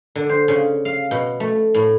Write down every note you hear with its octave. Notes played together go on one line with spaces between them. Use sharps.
D3
C5
C#3
F5
B2
A3
A2